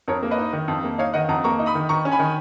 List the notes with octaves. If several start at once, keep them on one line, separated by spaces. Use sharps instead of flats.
F2 A#4 C#5
A#3
B4 D#5
D#4
D#3
F2
A#3
D#4 C#5 F5
D#3 D#5 F#5
F2 F#5 A#5
A#3 A#5 C#6
D#4
B5 D#6
D#3
D#3 A#5 C#6
C#4
G#5 B5
D#3